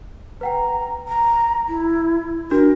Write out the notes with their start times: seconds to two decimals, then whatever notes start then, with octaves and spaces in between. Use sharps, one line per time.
0.41 B4 F#5 G5 A#5
1.08 A#5
1.68 E4
2.51 D4 F#4 A#4